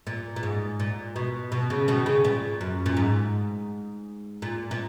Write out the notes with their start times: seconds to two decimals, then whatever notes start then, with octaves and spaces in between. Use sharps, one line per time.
0.07 A#2
0.36 A#2
0.43 G#2
0.80 A#2
1.16 B2
1.52 B2
1.70 C#3
1.88 B2 D#3
2.06 C#3
2.25 A#2
2.61 F#2
2.86 A#2
2.97 G#2
4.42 A#2
4.71 A#2